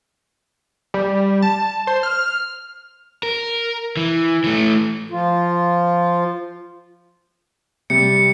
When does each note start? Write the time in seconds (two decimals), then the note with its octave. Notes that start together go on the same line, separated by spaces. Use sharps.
0.94 G3
1.42 A5
1.87 C5
2.03 F6
3.23 A#4
3.97 E3
4.44 E3 A3
5.11 F3 F4
7.90 C3 G3 C#7